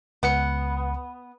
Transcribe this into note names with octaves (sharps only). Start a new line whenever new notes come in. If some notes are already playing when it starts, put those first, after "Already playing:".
C#2 B3 F#5 C#7